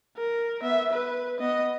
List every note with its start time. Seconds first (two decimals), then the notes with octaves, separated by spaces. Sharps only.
0.17 A#4
0.62 B3 E5
0.93 B4
1.39 B3 D#5